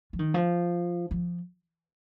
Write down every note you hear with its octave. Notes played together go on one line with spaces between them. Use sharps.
F3
D#3
F3
F3